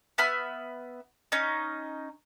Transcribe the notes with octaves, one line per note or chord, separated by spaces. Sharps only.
B3 E5 B5 F6
C#4 D#4